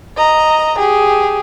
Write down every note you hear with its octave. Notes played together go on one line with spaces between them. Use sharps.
D#5 A#5
G4 G#4